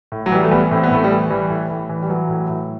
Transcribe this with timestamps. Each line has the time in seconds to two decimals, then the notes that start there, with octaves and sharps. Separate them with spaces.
0.12 A2
0.26 F#3
0.32 E3 G3
0.43 A3
0.51 E3 G3 B3
0.71 A2 C4
0.83 B3
0.91 A2 A3
1.04 G3
1.11 E3
1.30 E3 G3
1.50 A2
1.70 A2
1.89 E3
2.02 G3
2.09 E3 F#3
2.29 A2
2.49 A2